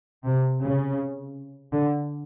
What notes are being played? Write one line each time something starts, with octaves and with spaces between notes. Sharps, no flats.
C3
C#3
D3